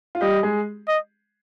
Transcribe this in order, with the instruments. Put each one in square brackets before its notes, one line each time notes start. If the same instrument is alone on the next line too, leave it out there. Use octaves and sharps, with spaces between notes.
[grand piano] F4
[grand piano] G3 G4 [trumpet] D#5
[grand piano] G#3 G#4
[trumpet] D#5